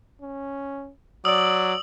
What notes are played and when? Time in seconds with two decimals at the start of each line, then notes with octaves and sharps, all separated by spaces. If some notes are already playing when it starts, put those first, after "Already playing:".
0.22 C#4
1.25 F#3 D5 D#6 E6 F#7